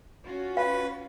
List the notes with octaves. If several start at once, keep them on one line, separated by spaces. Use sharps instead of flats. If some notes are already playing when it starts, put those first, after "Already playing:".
C#4 F4 F#4
B4 F5